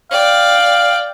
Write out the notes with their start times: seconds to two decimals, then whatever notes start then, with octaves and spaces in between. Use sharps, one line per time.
0.11 D5 F5 G5